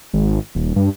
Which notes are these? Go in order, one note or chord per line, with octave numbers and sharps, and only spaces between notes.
G#1
D#1
G2